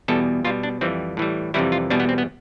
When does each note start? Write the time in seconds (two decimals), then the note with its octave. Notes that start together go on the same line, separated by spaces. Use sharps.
0.08 E2 B2 G3 A4
0.44 B2 G3 F4
0.63 D4
0.81 F2 E3 G3 C4
1.17 A2 E3 G3
1.54 F2 C3 E3 G3 E4
1.72 F4
1.90 E2 B2 G3 D4
2.00 B3
2.09 C4
2.18 B3